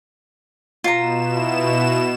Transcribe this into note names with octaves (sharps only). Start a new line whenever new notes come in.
B2 F4 A#5 E7
E4